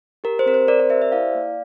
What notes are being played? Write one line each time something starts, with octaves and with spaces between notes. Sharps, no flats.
G4 A#4
C5
C4 A#4
C5
C4 A#4 D5
A#4 D5
G4 C5 E5
C5 E5
E4 D5 F5
A#3